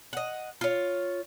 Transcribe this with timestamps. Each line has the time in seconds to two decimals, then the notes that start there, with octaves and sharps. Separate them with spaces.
0.13 D#5 F#5
0.61 F4 C#5